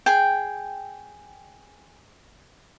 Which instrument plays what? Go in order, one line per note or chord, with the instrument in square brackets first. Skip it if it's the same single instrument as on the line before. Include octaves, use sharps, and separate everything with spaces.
[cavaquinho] G#4 G5